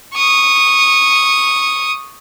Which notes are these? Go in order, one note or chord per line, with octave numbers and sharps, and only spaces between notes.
C#6 D#6